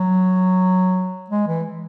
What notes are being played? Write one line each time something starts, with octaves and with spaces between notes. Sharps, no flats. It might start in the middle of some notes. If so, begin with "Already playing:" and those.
Already playing: F#3
G#3
E3